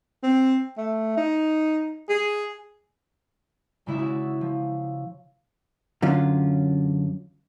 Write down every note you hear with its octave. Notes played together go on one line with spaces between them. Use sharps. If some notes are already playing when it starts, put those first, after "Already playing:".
C4
A3
D#4
G#4
D#1 C#3 G#3 E4 D5 E5
E4 F#4
F3
F#2 D3 C#4 F4